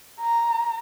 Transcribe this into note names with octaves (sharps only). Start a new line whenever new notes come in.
A#5